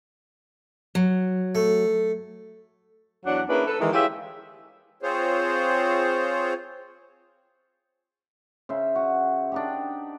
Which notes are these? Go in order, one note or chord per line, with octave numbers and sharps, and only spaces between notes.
F#3
A3
E2 F#3 D4 F#5
A#3 C#4 D4 E4 G#4 B4
A4 B4
D#3 E3 G#3
E4 F4 G4 G#4 C#5 E5
C4 F4 G#4 C5 C#5
C#3 C5 E5
F#4
D4 D#4 G4